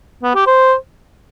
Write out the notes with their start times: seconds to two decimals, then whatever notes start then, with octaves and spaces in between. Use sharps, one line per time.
0.23 B3
0.35 G4
0.47 C5